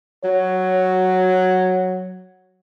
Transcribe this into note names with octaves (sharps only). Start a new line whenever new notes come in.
F#3 C#5